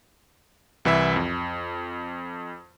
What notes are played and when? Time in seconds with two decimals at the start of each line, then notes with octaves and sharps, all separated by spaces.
0.85 C2 E3 E4 E5
1.16 F2